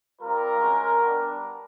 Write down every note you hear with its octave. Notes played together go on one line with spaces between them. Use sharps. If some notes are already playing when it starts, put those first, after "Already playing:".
G3 C4 F4 A#4
G#3 C#4 F#4
G3 B3 D4